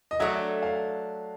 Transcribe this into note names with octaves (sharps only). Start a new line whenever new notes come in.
D#5
F#3 A3 D4 E5
F5